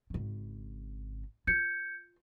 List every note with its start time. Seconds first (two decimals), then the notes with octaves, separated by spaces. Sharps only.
0.10 G#1 C#3
1.47 F4 G6 G#6 C#7